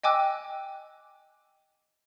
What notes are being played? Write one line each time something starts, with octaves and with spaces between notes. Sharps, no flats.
D#5 G5 G#5 D6 E6 F#6